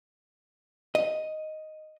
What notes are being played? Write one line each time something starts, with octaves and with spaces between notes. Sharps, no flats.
D#5